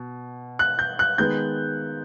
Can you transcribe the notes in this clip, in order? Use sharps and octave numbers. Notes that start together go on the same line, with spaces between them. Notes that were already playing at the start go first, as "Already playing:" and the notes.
Already playing: B2
F#6
G6
F#6
D#3 G#3 B3 G6